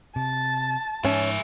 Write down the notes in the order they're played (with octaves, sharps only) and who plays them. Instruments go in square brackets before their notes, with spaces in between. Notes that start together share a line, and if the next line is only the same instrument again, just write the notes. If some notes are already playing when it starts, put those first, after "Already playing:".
[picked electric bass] C3 [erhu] A5
[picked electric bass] G#2 [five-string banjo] C#4 [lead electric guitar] G#4 E5